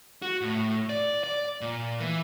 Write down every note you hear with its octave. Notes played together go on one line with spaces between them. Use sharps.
F#4
A2
D5
D5
A#2
E3